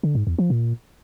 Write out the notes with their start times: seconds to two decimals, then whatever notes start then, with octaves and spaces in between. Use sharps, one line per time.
0.03 D3
0.15 G#2
0.27 E2
0.39 F3
0.50 A#2